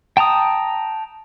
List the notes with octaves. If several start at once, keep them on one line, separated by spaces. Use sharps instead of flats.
G5 A5 A#5 D#6